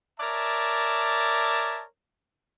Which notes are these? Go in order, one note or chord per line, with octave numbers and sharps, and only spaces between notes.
A#4 C#5 D5 E5 A5